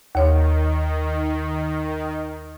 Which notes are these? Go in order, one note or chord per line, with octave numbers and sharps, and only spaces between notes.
D#2 D#3 C#5